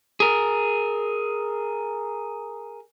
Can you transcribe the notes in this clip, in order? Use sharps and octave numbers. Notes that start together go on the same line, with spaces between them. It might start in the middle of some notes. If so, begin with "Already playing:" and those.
G#4 A#4